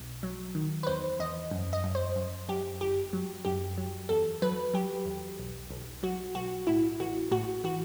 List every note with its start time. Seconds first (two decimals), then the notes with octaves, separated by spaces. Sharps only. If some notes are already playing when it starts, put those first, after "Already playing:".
Already playing: B1 B2
0.23 F#3
0.55 D#3
0.83 B4
0.87 E2 C5
1.19 E2 D#5
1.51 F#2
1.73 D#5
1.84 F#2
1.95 C5
2.16 F#2
2.49 F#2 G4
2.81 G1 G4
3.13 F#3
3.45 F#2 G4
3.78 F#3
4.09 E2 A4
4.42 F#3 B4
4.74 F#3 G4
5.06 E2
5.39 B1
5.71 B1
6.03 F#3 F#4
6.35 B1 F#4
6.67 A2 E4
7.00 A1 F#4
7.31 A2 F#4
7.64 E3 F#4